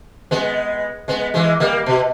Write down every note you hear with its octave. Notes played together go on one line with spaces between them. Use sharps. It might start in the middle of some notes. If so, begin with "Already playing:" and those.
G#3 B3
G#3 B3
E3 G#3
G3 A#3
B2